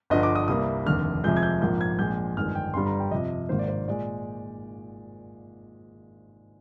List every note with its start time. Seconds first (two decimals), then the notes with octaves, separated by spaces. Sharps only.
0.10 G1 G2 D3 F3 D#5
0.23 D6
0.35 D#6
0.48 C2 C3 G3 A#3 D#6
0.86 F1 D#2 D3 F6
1.24 F2 C3 F3 G#3 G6
1.37 G#6
1.43 G6
1.61 A#1 G#2 F3 A#3 G6
1.81 G#6
1.99 A#1 A#2 G#3 G6
2.37 G1 F2 D#3 G#3 F6
2.55 G5
2.74 G1 G2 D3 G3 C6
2.86 A#5
3.00 G5
3.11 F2 C3 F3 D#5
3.49 G#1 G#2 D#3 A#3 C5
3.59 D5
3.68 C5
3.88 A#2 G#3 D5